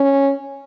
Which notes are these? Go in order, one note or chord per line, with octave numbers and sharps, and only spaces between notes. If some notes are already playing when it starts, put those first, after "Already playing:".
Already playing: C#4